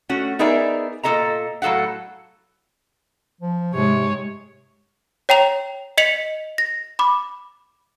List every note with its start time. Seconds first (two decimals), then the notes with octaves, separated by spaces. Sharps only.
0.09 A3 C#4 F#4
0.39 B3 D#4 G#4 A#4 D5 E5
1.03 A#2 C4 A4 D#5 A#5
1.62 A2 F#3 A4 F5 F#5
3.41 F3
3.74 G#2 C3 G#3 C#5
5.29 C#5 G5 A#5 F7
5.98 D#5 B6 C#7 F7 F#7
6.58 A#6
6.99 B5 D6